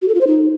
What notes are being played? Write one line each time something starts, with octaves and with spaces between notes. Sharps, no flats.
F#4
A4
F4
C5
D#4